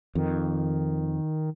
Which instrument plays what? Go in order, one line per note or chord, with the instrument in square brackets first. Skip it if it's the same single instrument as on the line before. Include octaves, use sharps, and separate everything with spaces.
[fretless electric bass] F2 [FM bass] D#3